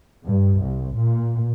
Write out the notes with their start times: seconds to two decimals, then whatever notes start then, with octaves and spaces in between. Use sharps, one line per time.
0.25 G2
0.61 C2
0.95 A#2